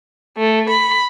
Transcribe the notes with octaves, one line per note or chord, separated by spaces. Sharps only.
A3
B5